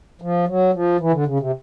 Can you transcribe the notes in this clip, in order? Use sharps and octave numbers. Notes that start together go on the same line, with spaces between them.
F3
F#3
F3
E3
D3
C#3
C3